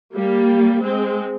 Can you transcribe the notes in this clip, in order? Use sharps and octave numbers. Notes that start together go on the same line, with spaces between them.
G3 A#3
G#3 C4